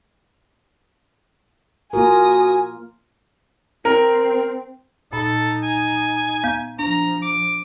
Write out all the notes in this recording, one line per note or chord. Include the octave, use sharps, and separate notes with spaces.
A#3 F4 F#4 A#4 G#5 D#6
C4 A#4
A#2 D#4 A4
G#5
B3 F5 G6
F3 D4 A#5
D6